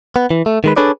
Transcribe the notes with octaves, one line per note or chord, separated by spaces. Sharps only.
B3
E3
A3
D#3 G#3 B4
D4 G#4 A4 B4 C#5 D5